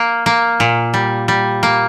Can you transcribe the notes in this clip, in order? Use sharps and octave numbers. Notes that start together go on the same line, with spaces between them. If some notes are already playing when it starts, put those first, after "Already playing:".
Already playing: A#3
A#3
A#2
G3
G3
A#3